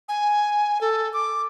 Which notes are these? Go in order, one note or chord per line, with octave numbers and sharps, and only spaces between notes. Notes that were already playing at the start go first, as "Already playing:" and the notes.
G#5
A4
D6